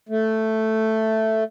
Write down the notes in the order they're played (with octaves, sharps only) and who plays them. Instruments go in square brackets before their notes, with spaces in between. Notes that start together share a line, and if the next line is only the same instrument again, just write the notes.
[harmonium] A3